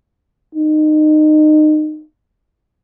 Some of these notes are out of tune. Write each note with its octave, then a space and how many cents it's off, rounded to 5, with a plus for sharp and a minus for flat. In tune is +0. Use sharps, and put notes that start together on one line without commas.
D#4 -25